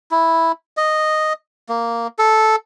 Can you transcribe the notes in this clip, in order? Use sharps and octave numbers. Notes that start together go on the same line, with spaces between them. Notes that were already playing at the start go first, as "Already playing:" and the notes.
E4
D#5
A#3
A4